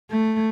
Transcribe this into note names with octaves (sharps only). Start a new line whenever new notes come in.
A3